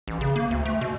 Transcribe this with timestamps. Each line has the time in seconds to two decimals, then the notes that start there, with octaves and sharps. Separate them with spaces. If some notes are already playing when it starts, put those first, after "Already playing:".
0.08 A1
0.21 C#3
0.36 A#3
0.51 D2
0.65 A3
0.81 B2